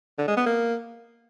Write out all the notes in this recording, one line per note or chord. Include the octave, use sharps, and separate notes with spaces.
D3
G#3
B3
A#3